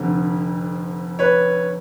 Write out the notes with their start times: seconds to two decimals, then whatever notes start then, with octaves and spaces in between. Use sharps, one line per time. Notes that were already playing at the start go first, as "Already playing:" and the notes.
Already playing: F1 F2 D3
1.19 B4 C#5